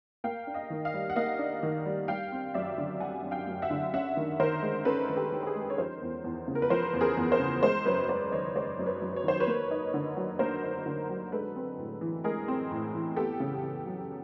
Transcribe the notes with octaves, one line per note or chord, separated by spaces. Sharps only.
A#3 F5 G5
D4
D#5 F5
D#3
D#5 F5
G3
F#5
A#3 D#5 F5
D4
D#3
G3
G3 F5 G5
C4
F#2 D5 E5
D3
G3 F#5 G#5
C4
F5 G5
F#2
E5 F#5
D3
C#4 E5 F#5
D#3
D#3 A#4 C5
G#3
C#4 A4 B4
D#3
G4 A4
D#3
G4
G#4
G#3
C#5
F3 A#4 C5
E2
E2
C#3
A#4
B4
F3 A#4 C5
E2
G#4 A#4
E2
A#4 C5
C#3
G#3 A#4 C5
F#2 B4 C#5
F#2 C5 D5
D#3 C#5 D#5
G#3 C5 D5
F#2
B4 C#5
F#2
C#5
D#3 C5
B4 C#5
A#3
D#4
D3
F#3
A#3 A#4 C5
D#4
D3
F#3
G#3 A4 B4
C4
A2
E3
G#3 G#4 A#4
C4
A2
E3
B3 G4 A4
C#3
C#3
F#3